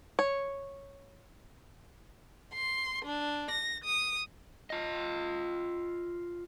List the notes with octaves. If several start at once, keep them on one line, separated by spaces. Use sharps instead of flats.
C#5
C6
D4
A#6
D#6
F4 D#5